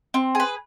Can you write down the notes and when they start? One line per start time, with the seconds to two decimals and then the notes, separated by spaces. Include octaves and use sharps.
0.14 C4
0.35 G#4 B4